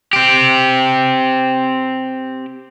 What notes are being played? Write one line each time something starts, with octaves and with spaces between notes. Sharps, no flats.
C4 G4